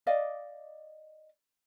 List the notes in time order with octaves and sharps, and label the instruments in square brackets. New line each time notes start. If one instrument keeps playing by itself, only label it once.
[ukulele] D5 D#5 F5